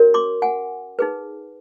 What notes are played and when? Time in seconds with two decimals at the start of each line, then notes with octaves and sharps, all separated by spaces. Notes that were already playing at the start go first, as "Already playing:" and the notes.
Already playing: C#4 F#4 A#4 C#5
0.14 C6 D6
0.42 F#5 G#5
0.99 D#4 G#4 B4